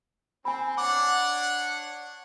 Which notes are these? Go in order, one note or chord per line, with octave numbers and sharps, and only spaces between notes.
C4 G#5 B5
D4 C#5 F#5 D6